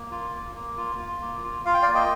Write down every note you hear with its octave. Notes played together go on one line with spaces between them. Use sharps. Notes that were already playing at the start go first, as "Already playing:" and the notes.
Already playing: A#3
F4
A#3
A#3
F4
F4
A#3
F4
F4 F5
G5
D5 F5
A#3
D#5 G5